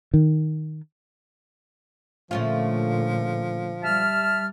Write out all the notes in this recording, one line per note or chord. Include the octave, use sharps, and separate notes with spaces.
D#3
A#2 D3 F3 A3 C#4 F4
G3 E5 A5 F6